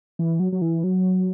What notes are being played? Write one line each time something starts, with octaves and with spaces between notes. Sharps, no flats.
E3
F#3
F#3
E3
F#3